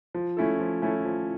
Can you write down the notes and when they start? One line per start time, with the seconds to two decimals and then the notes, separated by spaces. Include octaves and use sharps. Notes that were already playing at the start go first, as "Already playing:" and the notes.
0.15 F3
0.37 A3 C#4 E4 A4
0.59 F3
0.82 A3 C#4 E4 A4
1.05 F3